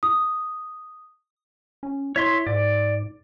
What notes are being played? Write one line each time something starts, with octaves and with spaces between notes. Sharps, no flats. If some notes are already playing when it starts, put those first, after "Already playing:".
D#6
C#4
E4 C#5 E5 C6
G#2 D5